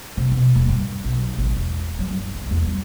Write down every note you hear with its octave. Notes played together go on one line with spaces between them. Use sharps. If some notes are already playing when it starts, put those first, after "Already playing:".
C3
B2
D#1
G2
B1
A1
E1
F#3
G2
C2
E2
G3